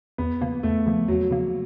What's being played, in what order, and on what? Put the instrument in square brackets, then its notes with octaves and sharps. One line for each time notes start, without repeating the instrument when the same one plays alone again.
[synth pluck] E2 [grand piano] B3
[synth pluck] C#3 F3 A#3
[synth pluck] E2 [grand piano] A3
[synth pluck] C#3 F3 A#3
[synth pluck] E2 [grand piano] F#3
[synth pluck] C#3 F3 A#3